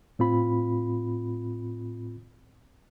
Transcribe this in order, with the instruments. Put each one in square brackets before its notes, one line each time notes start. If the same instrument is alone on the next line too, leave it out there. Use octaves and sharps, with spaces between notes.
[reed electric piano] A2 C4 F4 B5